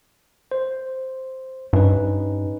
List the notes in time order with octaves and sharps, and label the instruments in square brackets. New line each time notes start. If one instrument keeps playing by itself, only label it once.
[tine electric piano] C5
[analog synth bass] G2 [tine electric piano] C#4 D#4 B4